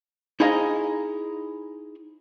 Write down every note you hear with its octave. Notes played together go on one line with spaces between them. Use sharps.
D#4 E4 G#4 C5 D#5 F5